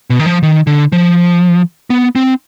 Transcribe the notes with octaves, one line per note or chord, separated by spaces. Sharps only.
B2
D#3
F3
D#3
D3
F3
B3
C4